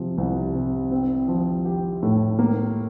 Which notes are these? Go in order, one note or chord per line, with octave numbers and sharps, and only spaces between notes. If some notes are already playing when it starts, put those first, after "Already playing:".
Already playing: C3 F3
C2
C3
C4
F3
G4
A2
A#3